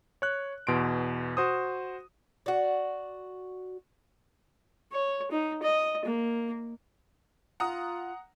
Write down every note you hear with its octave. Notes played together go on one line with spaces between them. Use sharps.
C#5 F#6
E2 B2 C6 D7
F#4 C5 D#6
F#4 D5
C#5
D#4
D#5
A#3
F4 F#5 A#5 D#6